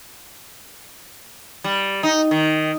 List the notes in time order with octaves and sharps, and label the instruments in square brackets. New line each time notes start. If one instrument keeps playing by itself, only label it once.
[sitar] G3
D#4
D#3